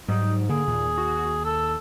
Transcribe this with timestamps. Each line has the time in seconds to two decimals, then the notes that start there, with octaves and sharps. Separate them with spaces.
0.08 G#2 F#3 G3 D#4
0.49 D3 A#3 G#4
0.68 D#2 A#2
0.98 F#4
1.45 A4 E6